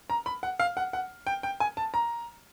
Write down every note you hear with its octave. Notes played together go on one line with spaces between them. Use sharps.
A#5
B5
F#5
F5
F#5
F#5
G5
G5
G#5
A5
A#5